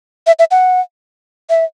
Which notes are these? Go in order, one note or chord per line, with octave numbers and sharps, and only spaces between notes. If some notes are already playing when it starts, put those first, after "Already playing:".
E5
E5
F#5
E5